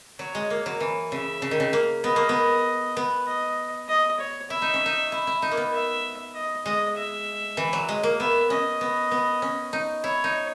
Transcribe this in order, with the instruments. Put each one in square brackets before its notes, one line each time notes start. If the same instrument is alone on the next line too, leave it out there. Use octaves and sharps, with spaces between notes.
[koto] F#3 [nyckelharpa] C#5
[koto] G#3
A#3
F#3
E3
[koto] C#3 [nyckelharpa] E5
[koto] C#3
D#3
C#3
A#3
[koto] B3 [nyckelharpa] D#5
[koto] A#3
B3
B3
[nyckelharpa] D#5
D#5
C#5
[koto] E4 [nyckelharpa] E5
[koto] D#4
C#4
D#4
E4
E4
D#4
A#3
B3
[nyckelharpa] E5
D#5
[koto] G#3 [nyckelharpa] D#5
[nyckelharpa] E5
[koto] E3
F#3
G#3
A#3
[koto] B3 [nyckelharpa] E5
[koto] C#4 [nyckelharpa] D#5
[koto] B3
B3
C#4
D#4
[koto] E4 [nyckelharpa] C#5
[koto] D#4